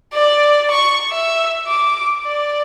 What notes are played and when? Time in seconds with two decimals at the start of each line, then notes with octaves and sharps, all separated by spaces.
0.13 D5
0.70 C#6
1.10 E5
1.67 D6
2.24 D5